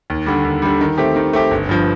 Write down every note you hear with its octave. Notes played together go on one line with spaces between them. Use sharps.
D#2
D3 G3
D#2
D3 G3
D#3
A3 C4 G4
D#3
A3 C4 G4
G1
G2 F3